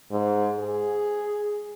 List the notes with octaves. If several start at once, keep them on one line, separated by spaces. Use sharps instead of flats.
G#2
G#4